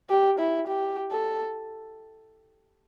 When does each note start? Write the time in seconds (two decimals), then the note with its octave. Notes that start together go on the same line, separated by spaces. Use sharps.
0.09 G4
0.39 E4
0.68 G4
1.11 A4